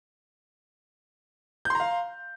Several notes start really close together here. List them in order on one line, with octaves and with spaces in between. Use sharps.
G6 C6 A#5 F5